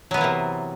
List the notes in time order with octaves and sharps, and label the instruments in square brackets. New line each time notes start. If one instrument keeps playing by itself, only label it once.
[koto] F#3
B3
E3
A#3
C3